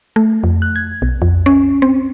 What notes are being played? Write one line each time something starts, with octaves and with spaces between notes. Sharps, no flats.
A3
F2
F#6
G#6
B1
F2
C#4
C4